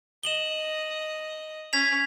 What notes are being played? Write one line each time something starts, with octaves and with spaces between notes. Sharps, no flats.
D#5 E7 F#7 G7
C#4 G#6 B6 F7